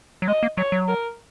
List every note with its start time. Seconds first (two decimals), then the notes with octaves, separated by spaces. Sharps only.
0.22 F#3
0.28 G#3 D#5
0.43 A#3
0.57 F#3 C#5
0.72 F#3
0.88 A#4